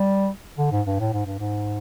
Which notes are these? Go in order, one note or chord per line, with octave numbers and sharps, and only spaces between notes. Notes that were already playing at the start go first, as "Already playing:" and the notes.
Already playing: G3
D3
G#2
G2
A2
G#2
G2
G#2